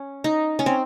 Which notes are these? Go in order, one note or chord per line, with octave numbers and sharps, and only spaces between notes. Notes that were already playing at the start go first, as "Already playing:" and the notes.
Already playing: C#4
D#4
C#4
C4